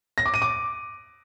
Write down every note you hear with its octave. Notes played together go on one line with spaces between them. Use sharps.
A#6
D6
D#7
D6